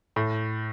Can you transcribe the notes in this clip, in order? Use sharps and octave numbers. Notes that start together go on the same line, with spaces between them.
A2